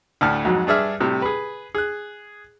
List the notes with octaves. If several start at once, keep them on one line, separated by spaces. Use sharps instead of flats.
D2 A2 A5 F6
F2 G#2 F#3
G2 D4 G#4 E5 F6
A2 C3 G3
G#4 B4
G#4 F#6